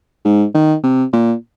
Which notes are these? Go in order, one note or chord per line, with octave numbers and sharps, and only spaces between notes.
G#2
D#3
C3
A#2